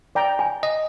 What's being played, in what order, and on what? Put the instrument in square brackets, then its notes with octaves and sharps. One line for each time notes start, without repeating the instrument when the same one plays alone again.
[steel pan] D5 G5 A#5
[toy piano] G#5
[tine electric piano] D#5